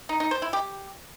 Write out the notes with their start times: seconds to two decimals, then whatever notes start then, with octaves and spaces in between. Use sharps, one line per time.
0.09 D#4
0.20 D#4
0.31 C5
0.42 E4
0.53 G4